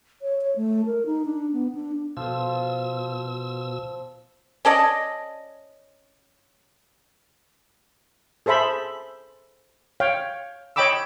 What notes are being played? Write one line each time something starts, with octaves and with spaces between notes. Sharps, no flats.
C#5
C#5
A3
A#4
D#4
D4
B3
D4
B2 F3 E6
C#4 A4 D5 D#5
G#4 A4 C5 E5 B5
C#5 F5 G5
C#5 D#5 G5 B5 D6 E6